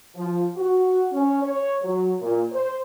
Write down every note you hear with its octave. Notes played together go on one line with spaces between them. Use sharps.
F3
F#4
C#4
C#5
F#3
A#2
C5